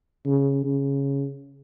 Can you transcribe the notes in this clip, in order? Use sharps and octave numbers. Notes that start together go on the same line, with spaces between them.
C#3
C#3